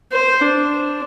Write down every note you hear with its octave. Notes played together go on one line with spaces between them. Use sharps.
C5
D4